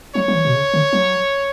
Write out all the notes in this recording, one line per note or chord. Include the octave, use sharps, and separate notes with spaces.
F#3 C#5
F#3
E3
B2
C#3
D3
F#3